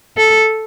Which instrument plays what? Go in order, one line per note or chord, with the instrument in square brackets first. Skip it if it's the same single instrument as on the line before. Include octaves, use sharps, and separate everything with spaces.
[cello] A4